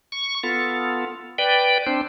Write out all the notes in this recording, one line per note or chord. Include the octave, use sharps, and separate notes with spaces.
C#6
B3 F4 A4
B4 D5 G5
C4 D4 C5